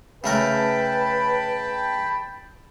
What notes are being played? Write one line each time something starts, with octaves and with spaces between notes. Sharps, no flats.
C#3 A3 A#4 B4 G5 A5 B5